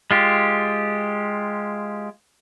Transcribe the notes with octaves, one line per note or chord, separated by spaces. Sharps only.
G#3 F4 G4